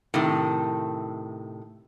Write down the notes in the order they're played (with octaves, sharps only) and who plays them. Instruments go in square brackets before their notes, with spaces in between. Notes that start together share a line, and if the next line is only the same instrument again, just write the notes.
[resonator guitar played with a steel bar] A2 C3 D#3